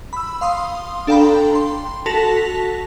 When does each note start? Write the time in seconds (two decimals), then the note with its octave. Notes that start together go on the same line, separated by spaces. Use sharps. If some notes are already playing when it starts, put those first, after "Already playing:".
0.13 B5 E6
0.41 F5 C6 D#6
1.07 D4 A4 F5 G5 A#5 B5
1.55 C6
2.06 F#4 A4 A5 A#6 B6 F7